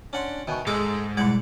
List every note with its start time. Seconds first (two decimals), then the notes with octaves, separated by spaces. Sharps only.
0.13 C#4 D4 F#5 C6
0.47 B2 D#3 E5 G#5 C#6
0.67 G#2 G#3 D#4 A4 D6
1.17 E2 B2 G3 G#3 D5 F#5